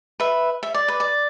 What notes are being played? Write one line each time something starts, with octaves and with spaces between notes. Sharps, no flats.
B4 E5
E5
D5
B4
D5